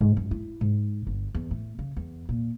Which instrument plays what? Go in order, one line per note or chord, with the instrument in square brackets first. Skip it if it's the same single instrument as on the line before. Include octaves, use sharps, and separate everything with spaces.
[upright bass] G#2
F#2
E4
G#2
G1
E2
A2
C#3
E2
A#2